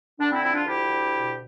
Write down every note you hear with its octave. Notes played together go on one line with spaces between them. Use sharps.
D3 D4
C4 E4
F3 C4 E4
D4 F4
D2 E4 G4
D2
B2